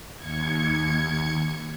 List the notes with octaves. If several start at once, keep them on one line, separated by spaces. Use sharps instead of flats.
D#2 G#6 C#7